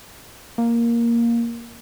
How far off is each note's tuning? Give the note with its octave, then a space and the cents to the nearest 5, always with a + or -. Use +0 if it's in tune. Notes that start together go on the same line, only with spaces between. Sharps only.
A#3 +5